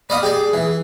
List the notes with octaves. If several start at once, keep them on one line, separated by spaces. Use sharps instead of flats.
D5 D#5 F5 B5
G4 G#4 D5
E3